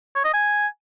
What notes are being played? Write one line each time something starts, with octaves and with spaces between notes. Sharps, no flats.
C#5
D#5
G#5